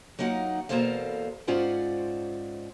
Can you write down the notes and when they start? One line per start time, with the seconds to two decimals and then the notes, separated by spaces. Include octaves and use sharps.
0.19 F#3 A#3 D#4 F4 F#5
0.69 E2 B2 A#3 A4 C5 F5
1.47 G#2 C#4 F4 C5 D5 F#5